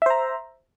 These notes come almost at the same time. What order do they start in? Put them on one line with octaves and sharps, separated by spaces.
E5 C5 A#5